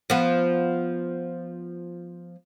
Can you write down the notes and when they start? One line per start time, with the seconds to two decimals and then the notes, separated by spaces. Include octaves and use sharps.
0.10 F3 B3